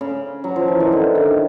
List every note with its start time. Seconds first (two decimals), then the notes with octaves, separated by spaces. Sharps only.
0.01 C#3
0.44 F#3
0.56 F3
0.68 E3
0.80 D#3
0.92 D3
1.15 D#3